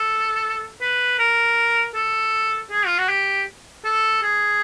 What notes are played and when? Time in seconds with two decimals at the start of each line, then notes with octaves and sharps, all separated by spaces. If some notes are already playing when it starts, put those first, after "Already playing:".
Already playing: A4
0.81 B4
1.19 A#4
1.95 A4
2.71 G#4
2.87 F4
2.98 F#4
3.09 G4
3.85 A4
4.23 G#4